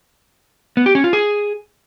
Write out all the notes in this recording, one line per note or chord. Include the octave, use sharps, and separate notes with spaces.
B3
G4
C#4
F4
G#4